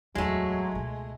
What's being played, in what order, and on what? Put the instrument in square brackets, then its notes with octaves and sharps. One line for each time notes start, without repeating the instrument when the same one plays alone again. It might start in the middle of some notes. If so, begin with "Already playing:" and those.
[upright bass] D1 E2 [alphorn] F#3 [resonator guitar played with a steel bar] G#3 A3
[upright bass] C#2 B2